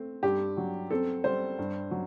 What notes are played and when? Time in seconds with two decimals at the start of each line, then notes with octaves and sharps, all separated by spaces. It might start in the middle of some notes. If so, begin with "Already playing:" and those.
Already playing: A3 C4
0.23 G2 G4
0.57 F#3
0.91 C4 A4
1.24 G3 C5
1.59 G2
1.91 F#3